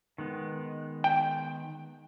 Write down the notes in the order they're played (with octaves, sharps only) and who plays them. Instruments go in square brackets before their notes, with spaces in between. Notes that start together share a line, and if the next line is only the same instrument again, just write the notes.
[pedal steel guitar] D#3 G#3 B3
[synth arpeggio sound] G5